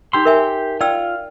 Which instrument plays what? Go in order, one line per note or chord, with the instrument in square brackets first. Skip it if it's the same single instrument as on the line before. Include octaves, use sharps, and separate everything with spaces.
[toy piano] D#4 E6 [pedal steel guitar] G4 C6
[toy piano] A#4 E5 G#5
[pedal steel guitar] F4 [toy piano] D5 G5 E6